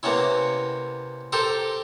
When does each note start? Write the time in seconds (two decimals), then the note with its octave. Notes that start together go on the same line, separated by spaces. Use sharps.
0.03 C3 A#3 B3 C#4 E4
1.32 G4 A4 A#4 C5